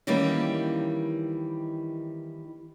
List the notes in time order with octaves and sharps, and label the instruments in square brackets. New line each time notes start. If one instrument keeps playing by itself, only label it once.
[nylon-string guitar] D#3 E3 G3 A#3 C#4 D#4